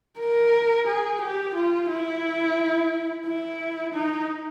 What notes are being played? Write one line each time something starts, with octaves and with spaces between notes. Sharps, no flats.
A#4
G#4
G4
F4
E4
E4
D#4